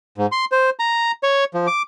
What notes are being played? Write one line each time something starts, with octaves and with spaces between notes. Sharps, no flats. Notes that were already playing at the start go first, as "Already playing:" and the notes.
G#2
C6
C5
A#5
C#5
F3
D6